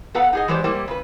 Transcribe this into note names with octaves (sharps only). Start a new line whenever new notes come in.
B3 A4 B4 F5 F#5 A#5
D#4 G#4 D#5
E3 F#3 G#3 G4 C5 D5
G3 A#3 E4 C5
C#3 B4